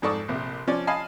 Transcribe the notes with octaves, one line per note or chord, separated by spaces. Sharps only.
F2 G#2 A4 D5 C#6 D#6
A#1 C3
F3 C#4 C#5 D5
D#5 F5 G#5 A5 B5